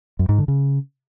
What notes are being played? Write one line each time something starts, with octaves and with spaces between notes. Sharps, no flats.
F#2
G#2
D3
C#3